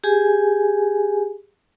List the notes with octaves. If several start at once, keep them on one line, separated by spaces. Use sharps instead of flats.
G4 G#4 G#5